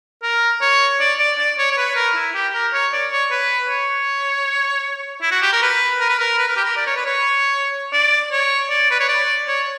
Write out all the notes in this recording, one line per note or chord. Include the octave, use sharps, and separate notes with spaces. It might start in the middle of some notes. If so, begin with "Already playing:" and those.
A#4
C#5
D5
D5
D5
C#5
C#5
B4
A#4
E4
G4
A#4
C#5
D5
C#5
B4
C#5
E4
F#4
G4
A#4
B4
A#4
B4
A#4
B4
A#4
G4
A#4
D5
C#5
B4
C#5
D5
C#5
D5
B4
C#5
D5
C#5